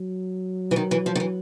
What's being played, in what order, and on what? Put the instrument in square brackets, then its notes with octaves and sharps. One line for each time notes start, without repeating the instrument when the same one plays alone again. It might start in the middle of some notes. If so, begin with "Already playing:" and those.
Already playing: [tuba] F#3
[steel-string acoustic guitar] E3
D#3
E3
F3
D#3
E3